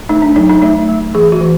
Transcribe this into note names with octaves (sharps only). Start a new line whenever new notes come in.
A3 D#4
D4
F#3 D#4
D#4
A3 D#4
A3
E3 G#4
F#4
E3